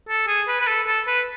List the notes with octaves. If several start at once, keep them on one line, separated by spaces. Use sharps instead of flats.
A4
G#4
B4
B4
A4
A4
B4